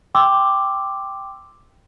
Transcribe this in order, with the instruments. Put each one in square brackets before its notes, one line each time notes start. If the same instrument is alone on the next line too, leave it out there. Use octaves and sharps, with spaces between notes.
[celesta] G5 C6 D6 E6